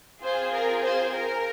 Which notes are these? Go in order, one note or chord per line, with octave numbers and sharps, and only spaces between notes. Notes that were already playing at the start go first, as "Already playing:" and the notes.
C4 F4 G#4 C5
A#4
C5
A#4